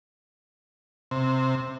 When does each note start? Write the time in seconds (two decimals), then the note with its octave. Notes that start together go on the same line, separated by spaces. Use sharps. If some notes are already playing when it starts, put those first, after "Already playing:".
1.11 C3